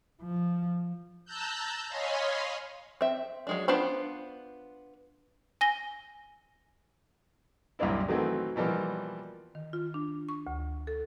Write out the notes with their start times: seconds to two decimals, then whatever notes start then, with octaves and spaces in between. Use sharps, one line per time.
0.22 F3
1.25 A5 A#5 E6 F#6 G6
1.89 C#5 D#5 F5 G#5 B5 C6
3.01 C4 E5
3.47 F#3 G#3 D4
3.68 B3 D4 F4 C5 B5
5.61 G#5 A#6 G7
7.79 C2 F#2 A#2 D4 E4
8.08 D#3 E3 F#3 A3 C4
8.56 B2 E3 F3 G3 A#3
9.55 D#3
9.73 F4
9.94 D4
10.29 C#6
10.47 D2
10.87 A4